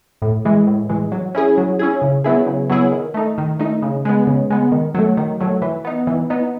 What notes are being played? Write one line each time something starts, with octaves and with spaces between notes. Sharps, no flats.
A2
E3 G#3
A2
E3 G#3
F#3
C#4 E4 G#4
F#3
C#4 E4 G#4
C#3
F#3 B3 E4 G#4
C#3
F#3 B3 E4 G#4
D#3
A3 D#4
D#3
A3 D#4
C#3
G#3 B3
C#3
G#3 B3
D#3
F#3 A3
D#3
F#3 A3
E3
B3 D#4
E3
B3 D#4